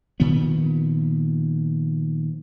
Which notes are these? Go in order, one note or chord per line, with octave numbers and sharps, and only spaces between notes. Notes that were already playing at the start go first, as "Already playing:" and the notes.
A#2 D#3 F3 B3